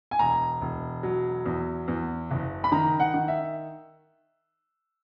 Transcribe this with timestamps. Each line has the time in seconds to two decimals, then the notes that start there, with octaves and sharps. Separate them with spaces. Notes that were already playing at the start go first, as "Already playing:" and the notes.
0.11 G#5
0.19 E1 A#5
0.61 E1
1.03 F#3
1.46 E2
1.88 E2
2.31 F#1
2.64 B5
2.72 D#3 A#5
3.00 F#5
3.14 D#3
3.28 E5